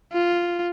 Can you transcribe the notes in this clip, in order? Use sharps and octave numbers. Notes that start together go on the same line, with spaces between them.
F4